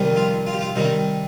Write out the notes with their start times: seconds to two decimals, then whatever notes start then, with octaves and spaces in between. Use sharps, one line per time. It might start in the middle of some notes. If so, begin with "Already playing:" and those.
Already playing: F2 C3 D#3 G3
0.16 F4
0.47 F4
0.53 G4
0.61 F4
0.76 C3 D#3 G3 D#4